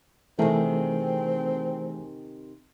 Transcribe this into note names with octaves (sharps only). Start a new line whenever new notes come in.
C3 D#3 E3 A3 C4 G#4 A#4